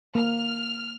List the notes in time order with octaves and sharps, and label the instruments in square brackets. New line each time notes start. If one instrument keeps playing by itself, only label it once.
[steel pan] A#3 [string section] F6